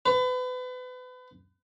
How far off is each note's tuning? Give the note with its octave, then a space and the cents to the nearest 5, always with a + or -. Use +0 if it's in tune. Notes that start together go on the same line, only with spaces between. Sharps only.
B4 +35